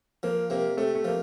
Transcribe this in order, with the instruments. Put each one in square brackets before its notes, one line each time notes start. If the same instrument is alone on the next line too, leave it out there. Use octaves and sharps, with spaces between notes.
[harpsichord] F3 [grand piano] A#3
[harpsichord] C3 [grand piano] A#3
[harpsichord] C3 [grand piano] A3
[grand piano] A3
[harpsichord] F3 [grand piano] A#3